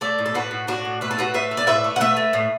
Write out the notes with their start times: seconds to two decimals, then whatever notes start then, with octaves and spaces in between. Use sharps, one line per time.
0.01 A3 A4 D5
0.19 A2
0.26 A4
0.35 A2 F#4 B4
0.51 A2
0.67 A2 D4 F#4
0.85 A2
1.01 A3 B4
1.11 A4
1.18 A2 F#4 B4
1.34 A2 B4 E5
1.51 A3
1.57 D5
1.67 A2 B4 E5
1.84 A3
1.96 F#5
2.00 A3 B4 E5
2.17 A3
2.33 A2